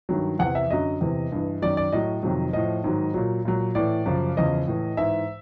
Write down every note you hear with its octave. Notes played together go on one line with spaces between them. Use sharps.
G2 D#3 F#3
E2 C3 E3 F#5
E5
F#2 D3 F#3 D#5
E2 C3 E3
G2 E3
F#2 D#3 F#3 D5
D5
A2 F#3 D#5
F2 C3 D#3 F#3
A2 F3 D#5
G#2 D#3 F#3
A#2 F#3
A#2 F#3
A2 E3 D5
F#2 C#3 F3
E2 C#3 F3 D#5
A2 E3
G#2 E3 E5